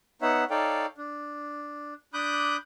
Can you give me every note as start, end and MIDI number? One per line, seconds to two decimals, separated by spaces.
0.22 0.44 59
0.22 0.44 63
0.22 0.44 73
0.22 0.44 76
0.22 0.44 78
0.50 0.86 63
0.50 0.86 69
0.50 0.86 73
0.50 0.86 74
0.50 0.86 77
0.50 0.86 79
0.98 1.94 62
2.14 2.57 62
2.14 2.57 83
2.14 2.57 86
2.14 2.57 87
2.14 2.57 90
2.14 2.57 91